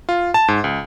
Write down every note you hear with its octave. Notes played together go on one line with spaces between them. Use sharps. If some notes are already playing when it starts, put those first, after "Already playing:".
F4
A5
G#2
C#2